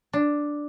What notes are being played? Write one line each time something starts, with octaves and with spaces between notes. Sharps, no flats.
D4